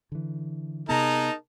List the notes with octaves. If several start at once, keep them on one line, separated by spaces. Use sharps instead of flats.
D3 E3
C3 B3 D#4 G#4 A#4 A5